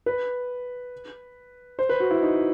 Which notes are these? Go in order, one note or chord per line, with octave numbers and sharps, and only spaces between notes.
B4
C5
B4
F#4
E4
D#4